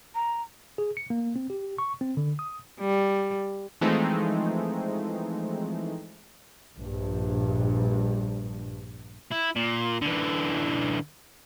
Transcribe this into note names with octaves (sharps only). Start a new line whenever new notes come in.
A#5
G#4
C#7
A#3
C4
G4
C#6
C4
D3
D#6
G3
E3 F3 G#3 A3 C4 D#4
A#1 G2
E4
A#2
D3 E3